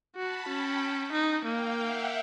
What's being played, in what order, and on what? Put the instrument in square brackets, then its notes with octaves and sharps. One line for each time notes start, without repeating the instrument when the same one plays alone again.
[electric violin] F#4 [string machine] A5 B5
[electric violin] C#4 [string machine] G5 A5
[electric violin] D#4
[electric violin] A#3 [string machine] F5 G5
[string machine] E5 F#5